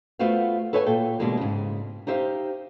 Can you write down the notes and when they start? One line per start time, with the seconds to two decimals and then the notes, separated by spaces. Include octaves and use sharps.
0.19 A3 B3 F4 F#4 C5 F5
0.73 A4 B4 C#5 E5 F#5 G#5
0.86 A#2 A4 G5
1.19 B2 D3 E3 G3 G#3 A#3
1.37 G#2 C#3
2.07 D#4 G4 C5 E5 F5